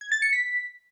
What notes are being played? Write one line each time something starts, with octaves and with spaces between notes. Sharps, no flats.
G#6
A6
C#7
B6